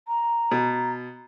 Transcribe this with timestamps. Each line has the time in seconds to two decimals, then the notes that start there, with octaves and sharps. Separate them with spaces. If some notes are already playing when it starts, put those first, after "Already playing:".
0.08 A#5
0.51 B2